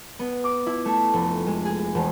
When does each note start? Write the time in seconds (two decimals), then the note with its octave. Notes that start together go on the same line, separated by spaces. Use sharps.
0.19 B3
0.44 D6
0.66 E4
0.85 A3
1.13 F1
1.46 G#3
1.65 G#4
1.95 E1